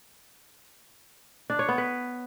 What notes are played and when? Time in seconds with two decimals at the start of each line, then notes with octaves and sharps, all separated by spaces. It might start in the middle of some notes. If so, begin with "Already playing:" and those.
1.50 D4
1.59 C#5
1.69 B3
1.78 B4